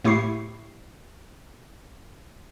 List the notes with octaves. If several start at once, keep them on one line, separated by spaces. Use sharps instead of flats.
A2 A3 E4 G4 C#6 C7